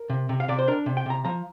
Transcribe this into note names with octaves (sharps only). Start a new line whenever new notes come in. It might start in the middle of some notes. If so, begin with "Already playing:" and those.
Already playing: A#4
C3
C3
F5
C3 D5
C5
D4 A#4
C3
G5
C3 A#5
F3 A#5